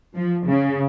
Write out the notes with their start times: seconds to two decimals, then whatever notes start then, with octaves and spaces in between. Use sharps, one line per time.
0.15 F3
0.47 C#3